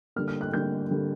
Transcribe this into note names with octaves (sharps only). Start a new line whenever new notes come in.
D3 G3 A#3 F6
F6
F#6
D3 G3 A#3 G6
D3 G3 A#3